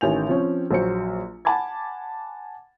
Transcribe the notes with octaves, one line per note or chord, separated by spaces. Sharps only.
A1 D#3 C#4 G#5 G6 F7
F3 C4 C#4
A#1 F#3 C5 C#7
F#5 G#5 A5 B5 D6 G#6